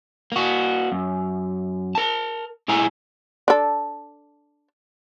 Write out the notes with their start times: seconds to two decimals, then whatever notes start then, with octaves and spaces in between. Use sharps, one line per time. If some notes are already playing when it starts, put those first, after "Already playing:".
0.32 A#3 F#4
0.92 F#2
1.95 A#4 A5
2.68 A#2 G#3 E4 G#5 A#5
3.48 D4 A4